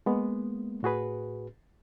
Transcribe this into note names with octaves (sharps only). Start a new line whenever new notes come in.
G#3 A#3 B3
A2 F#4 G#4 B4